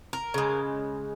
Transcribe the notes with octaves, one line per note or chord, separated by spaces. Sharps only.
A#4
C#3 G#3